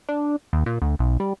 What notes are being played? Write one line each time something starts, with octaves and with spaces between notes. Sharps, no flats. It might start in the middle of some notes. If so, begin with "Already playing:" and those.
D4
D#2
A#2
D2
B1
G3